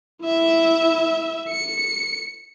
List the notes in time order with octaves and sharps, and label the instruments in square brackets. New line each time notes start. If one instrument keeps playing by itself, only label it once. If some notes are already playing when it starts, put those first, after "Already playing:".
[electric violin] E4 E5
C#7